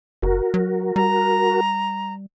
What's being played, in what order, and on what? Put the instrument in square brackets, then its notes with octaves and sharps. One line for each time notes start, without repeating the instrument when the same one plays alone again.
[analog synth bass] F#1 [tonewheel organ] F#4 A#4
[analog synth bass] F#3
[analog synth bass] G3 [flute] A#5